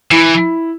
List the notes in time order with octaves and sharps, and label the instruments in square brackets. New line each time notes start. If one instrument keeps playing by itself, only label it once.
[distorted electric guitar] E3 [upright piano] E4